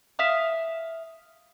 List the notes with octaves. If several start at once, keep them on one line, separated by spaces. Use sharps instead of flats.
E5 F5 D#6